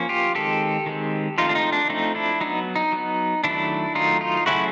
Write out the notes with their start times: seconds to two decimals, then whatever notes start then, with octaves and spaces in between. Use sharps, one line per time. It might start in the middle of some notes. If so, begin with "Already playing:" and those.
Already playing: F3 A#3 C#4
0.09 F4 G4
0.35 D#3 G#3 C4 G4 A4
0.86 D#3 G#3 C4
1.38 F3 A3 C4 D#4 F4
1.49 D4
1.55 D#4
1.72 D4
1.89 F3 A3 C4 D#4
2.15 D4 E4
2.40 F#3 B3 D#4
2.76 D#4
2.92 F#3 B3
3.44 D#3 F#3 A3 D4 E4
3.95 D#3 F#3 A3 D#4 F4
4.21 D#4 F4
4.46 C#3 F#3 A3 C#4 E4 F#4